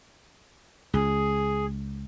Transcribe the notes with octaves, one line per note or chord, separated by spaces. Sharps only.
C#2 G#4